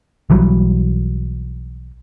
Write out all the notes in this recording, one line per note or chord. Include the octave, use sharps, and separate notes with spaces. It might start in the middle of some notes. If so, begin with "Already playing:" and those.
B1 E3 F#3 G3